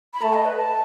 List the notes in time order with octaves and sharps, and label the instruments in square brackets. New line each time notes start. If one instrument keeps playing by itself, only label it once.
[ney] B5
[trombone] A3 [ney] A5
[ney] D#5
B4
A5